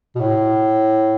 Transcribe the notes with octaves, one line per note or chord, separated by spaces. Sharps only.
B2
A2